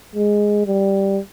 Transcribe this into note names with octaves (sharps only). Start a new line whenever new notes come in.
G#3
G3